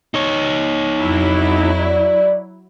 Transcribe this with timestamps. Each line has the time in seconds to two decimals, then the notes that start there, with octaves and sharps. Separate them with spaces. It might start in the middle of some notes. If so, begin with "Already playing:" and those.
0.14 D#4 C#5
0.99 F2 F#3 E4
1.80 D5